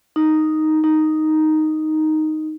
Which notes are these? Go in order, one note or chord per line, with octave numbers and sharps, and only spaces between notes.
D#4
D#4